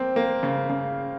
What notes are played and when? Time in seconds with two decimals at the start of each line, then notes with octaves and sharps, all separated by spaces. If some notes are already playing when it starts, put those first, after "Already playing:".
Already playing: A#3 C4
0.16 A#3
0.43 C#3
0.70 C#3